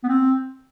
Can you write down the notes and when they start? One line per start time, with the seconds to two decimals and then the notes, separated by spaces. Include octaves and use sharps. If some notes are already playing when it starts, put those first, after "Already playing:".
0.03 B3
0.08 C4